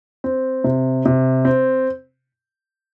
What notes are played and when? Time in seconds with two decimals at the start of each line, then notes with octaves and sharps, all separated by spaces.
0.24 C4
0.64 C3
1.05 C3
1.45 C4